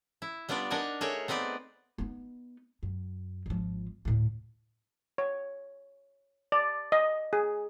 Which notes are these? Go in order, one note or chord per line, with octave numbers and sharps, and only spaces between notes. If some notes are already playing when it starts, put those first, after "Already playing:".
E4
G3 B3 D4 F4 D5
D4 D#4 A#4 F#5 G#5
A3 G#4 A#4 C#5
B3 C4 D#4 B4 D5
B3 D#4
F#2
G#1 F3
D2 A2
C#5
D5
D#5
G#4